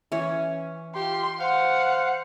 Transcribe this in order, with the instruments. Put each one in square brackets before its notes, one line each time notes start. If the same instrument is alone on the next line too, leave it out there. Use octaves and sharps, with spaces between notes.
[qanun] E3 C#5 [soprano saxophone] C#4
[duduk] F4 [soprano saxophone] G4 [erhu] C6
[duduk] C5 [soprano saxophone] F5 [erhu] F#5